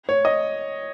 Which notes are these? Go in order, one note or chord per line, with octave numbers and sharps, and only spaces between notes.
C#5
D#5